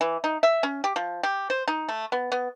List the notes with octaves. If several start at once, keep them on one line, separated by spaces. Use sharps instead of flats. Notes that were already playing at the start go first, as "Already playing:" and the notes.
E3
D#4
E5
C#4
G4
F3
G4
C5
D#4
A3
B3
B3